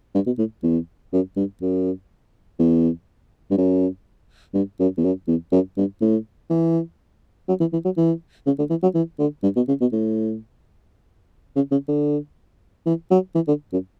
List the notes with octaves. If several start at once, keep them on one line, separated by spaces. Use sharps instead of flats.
G2
B2
A2
E2
F#2
G2
F#2
E2
G2
F#2
G2
F#2
E2
F#2
E2
F#2
G2
A2
E3
F#3
E3
E3
F#3
E3
C#3
D3
E3
F#3
E3
D3
G2
B2
C#3
B2
A2
C#3
C#3
D3
E3
F#3
E3
D3
F#2